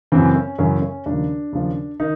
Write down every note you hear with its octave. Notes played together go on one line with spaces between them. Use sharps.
F#2 C#3 E3 C4
C#4
F#2 C#3 E3 C#4
C#4
D#2 C#3 F3 D4
D#2 C#3 F3
D#3 D#4